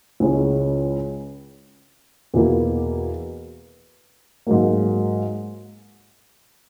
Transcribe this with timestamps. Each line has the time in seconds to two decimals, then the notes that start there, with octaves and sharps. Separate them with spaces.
0.20 C#2 C#3 G#3 C#4 E4
2.34 E2 B2 A#3 E4
4.47 G#2 F#3 A#3